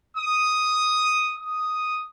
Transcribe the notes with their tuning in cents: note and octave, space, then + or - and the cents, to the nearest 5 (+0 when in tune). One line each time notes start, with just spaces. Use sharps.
D#6 +0
D#6 +0